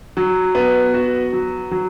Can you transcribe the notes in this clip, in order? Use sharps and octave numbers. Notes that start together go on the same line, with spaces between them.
F#3
B3
F#4
F#3
F#3